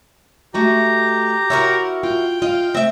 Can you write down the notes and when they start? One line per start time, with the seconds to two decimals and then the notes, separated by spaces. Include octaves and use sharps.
0.54 A3 F#4 G4 D#5 A#5
1.50 E4 F#4 A#4 C#5
2.03 F4 G5
2.42 F4 D#5 F5
2.75 A3 C4 E5